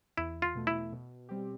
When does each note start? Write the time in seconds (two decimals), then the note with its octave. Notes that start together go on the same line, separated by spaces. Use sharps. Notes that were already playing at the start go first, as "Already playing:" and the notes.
0.17 E2 E4
0.42 F4
0.55 B2 A3
0.67 E4
0.92 B2
1.29 G3 C4 G4